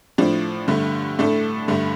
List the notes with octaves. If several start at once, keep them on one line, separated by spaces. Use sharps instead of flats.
A2 F3 D4
G2 D3 A3
A2 A3 D4 A4
G2 D3 A3